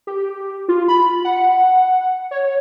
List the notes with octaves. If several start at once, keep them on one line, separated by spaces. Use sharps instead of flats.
G4
F4
B5
F#5
C#5